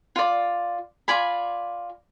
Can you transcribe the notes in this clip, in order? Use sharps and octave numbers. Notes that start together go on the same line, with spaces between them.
F4 D5
F4 D5 G#5 B5